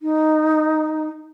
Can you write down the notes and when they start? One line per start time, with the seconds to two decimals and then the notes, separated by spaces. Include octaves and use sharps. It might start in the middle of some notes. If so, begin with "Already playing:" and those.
0.02 D#4